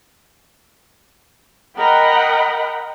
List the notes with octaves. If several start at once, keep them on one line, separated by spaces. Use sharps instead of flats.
A#4 D#5 F#5 G5 B5